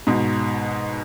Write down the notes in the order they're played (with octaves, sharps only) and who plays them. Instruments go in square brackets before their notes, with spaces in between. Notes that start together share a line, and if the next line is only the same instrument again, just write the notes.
[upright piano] G#2 B2